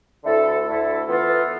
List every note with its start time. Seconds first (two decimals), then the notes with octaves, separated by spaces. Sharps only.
0.23 D2 D3 A3 E4 A4
0.66 D2 D3 A3 E4 A4
1.07 E3 B3 F4 A4